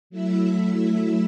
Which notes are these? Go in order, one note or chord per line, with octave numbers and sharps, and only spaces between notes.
F#3 A3 E4 E5